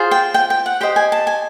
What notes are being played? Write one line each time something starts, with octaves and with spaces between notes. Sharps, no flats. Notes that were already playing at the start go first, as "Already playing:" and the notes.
Already playing: F4 G#4 C5
G5
G5
G5
F#5
G4 C5 D#5 G5
G#5
A5
G#5